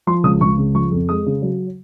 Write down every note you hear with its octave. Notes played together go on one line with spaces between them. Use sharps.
F3 C6
C#2 D#6
C#2 C#6
C#3
F3 C#6
F2
G#3 D#6
C#3
F#3